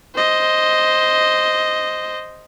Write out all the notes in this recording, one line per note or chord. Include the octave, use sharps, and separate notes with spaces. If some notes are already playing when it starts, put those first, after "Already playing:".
C5 D#5